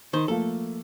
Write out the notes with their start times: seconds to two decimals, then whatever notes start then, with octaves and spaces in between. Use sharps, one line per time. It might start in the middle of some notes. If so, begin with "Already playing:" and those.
0.13 D#3 C5
0.28 F3 A3 A#3 A4